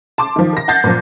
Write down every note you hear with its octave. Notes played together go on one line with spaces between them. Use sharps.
A5 C6 D6
D#3 F3
A#4 A#6
F#5 A5 G6 A6 A#6 C7
A#2 F3